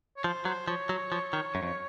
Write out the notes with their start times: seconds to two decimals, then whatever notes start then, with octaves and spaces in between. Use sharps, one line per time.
0.16 C#5
0.24 F3 C5
0.45 F#3 C5
0.68 F3 C#5
0.89 F#3
1.12 F3
1.33 D#3
1.55 F#2
1.63 F2